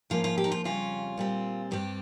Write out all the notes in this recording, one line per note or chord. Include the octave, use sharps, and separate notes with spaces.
G#2 F3 A#3 C#4 F4
F4
G4
D#4
F4
F2 C#3 G3 C#4 F4
A#2 G3 C4
G2 G3 C4 G4